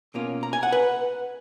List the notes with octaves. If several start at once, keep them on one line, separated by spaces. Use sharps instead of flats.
B2 A#3 C#4 F4
A#5
G#5
F#5
B4